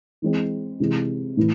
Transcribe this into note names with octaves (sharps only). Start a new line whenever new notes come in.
E3 G#3 C4
C3 E3 G#3
A2 E3